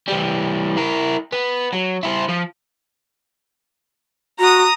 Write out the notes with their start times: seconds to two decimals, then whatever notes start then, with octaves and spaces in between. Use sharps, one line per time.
0.08 E3 G3
0.77 E4 A#4
1.33 B3
1.73 F#3
2.03 E4 C5
2.29 F3
4.39 F#4 A#5 D#6